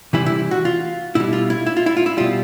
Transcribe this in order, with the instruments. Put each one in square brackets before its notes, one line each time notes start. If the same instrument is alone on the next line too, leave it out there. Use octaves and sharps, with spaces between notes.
[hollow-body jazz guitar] C3 E3 G3 E4
E4
F#4
F4
B2 G3 E4
F4
E4
E4
F4
E4
F4
E4
B2 G3 F4